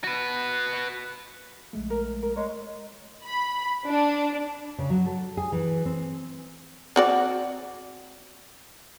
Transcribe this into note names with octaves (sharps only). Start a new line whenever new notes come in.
F#4 B4
A#1 G#3 A3
A#4
A#4
G#3 C#5
B5
D4
C#3
F#3
A4
G#4
E3
C4
C4 F#4 D5